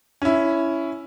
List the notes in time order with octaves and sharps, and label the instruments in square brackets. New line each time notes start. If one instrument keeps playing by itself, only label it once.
[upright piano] C#4 E4